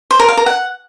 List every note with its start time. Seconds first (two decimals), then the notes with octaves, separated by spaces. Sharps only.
0.11 C5
0.19 A#4
0.28 F5
0.37 A#4
0.46 F#5